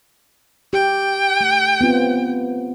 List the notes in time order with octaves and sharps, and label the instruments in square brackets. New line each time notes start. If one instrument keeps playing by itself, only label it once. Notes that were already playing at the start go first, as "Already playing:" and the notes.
[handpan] G4 [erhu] G5
[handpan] A3
B3 C4 F4